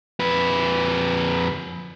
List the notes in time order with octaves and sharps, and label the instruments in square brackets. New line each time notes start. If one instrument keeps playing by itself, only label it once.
[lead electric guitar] F2 B4